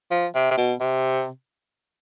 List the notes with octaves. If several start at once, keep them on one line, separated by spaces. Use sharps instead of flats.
F3
C3
C3
B2
C3